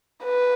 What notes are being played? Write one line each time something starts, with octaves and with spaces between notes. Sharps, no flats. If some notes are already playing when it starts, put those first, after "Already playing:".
B4